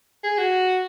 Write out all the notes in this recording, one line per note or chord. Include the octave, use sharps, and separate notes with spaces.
G#4
F#4